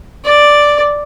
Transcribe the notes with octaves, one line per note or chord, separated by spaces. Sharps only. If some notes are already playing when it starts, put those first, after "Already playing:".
D5